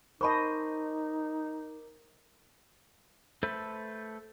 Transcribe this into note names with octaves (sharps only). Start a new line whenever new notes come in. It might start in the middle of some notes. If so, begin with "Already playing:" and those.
D#4 A#4 C5 D#5 A5 B5 C#6 D6
A3 A4 B4 C5